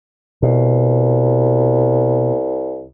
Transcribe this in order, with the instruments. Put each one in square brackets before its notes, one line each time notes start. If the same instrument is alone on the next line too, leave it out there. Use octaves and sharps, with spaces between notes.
[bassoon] C2 [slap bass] B2